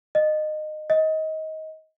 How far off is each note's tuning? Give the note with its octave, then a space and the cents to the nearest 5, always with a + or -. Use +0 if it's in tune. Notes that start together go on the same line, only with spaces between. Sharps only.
D#5 -20
D#5 +20